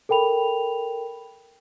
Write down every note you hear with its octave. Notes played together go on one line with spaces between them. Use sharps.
A4 A#4 G5 B5 F7